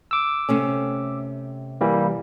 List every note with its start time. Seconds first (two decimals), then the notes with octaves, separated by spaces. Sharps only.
0.11 D6 E6
0.49 C3 A3 C#4
1.81 E3 G3 A#3